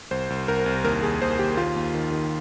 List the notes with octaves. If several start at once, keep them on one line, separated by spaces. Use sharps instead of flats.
C2 C5
C2
C2 A#4
C2
D#2 A#4
D#2 G#4
D#2 C5
D#2 G4
D#2 F4
D#2
D#3
D#3